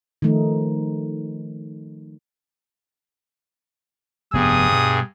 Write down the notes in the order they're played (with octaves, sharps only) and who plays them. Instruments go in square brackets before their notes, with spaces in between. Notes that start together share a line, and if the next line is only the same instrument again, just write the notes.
[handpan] D#3 F3 A3 D#4
[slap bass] F1 B3 [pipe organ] G2 G#4 [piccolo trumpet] D#6
[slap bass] B2